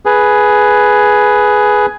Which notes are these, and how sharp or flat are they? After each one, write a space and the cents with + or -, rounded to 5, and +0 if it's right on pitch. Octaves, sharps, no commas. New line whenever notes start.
G#4 +10 B4 +0